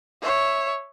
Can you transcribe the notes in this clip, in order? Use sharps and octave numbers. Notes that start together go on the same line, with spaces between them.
C#5 E5